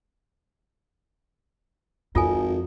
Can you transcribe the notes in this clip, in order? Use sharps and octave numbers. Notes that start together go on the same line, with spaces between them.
G#1 F2 F4 A4 G#5